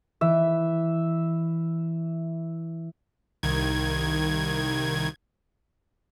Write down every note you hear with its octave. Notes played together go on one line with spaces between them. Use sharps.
E3 E5
C2 D#3 G#6